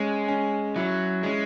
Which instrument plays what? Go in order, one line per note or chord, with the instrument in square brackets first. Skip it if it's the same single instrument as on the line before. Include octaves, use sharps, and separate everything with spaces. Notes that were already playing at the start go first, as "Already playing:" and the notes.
Already playing: [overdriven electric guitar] G#3 [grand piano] C#4
[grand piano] C#4
[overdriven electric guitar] F#3 [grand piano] E4
[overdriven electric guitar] G#3 [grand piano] C#4